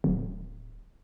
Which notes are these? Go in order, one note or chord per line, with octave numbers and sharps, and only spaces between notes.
D1